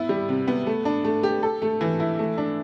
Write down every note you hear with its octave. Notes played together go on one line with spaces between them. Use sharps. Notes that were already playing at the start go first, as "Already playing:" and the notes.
Already playing: B3 E4
G3
C3
B3
A3
D4
A3
G4
A4
A3
E3
E4
A3
D4